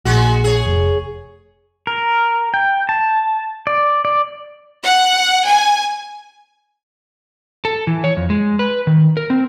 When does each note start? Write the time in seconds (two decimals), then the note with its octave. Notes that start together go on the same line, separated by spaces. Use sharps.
0.05 A#1 G#3 F#4
0.44 G#4 C#5
0.66 F1
1.87 A#4
2.54 G5
2.89 A5
3.67 D5
4.05 D5
4.83 F#5
5.45 G#5
7.65 A4
7.87 E3
8.04 C#5
8.17 F2
8.30 G#3
8.59 B4
8.87 D#3
9.17 A#4
9.30 C4